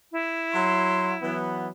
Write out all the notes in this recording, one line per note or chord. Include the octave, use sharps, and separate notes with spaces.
E4
F#3 C6
E3 F#3 B3